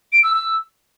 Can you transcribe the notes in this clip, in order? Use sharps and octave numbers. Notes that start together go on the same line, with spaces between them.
D7
E6
E6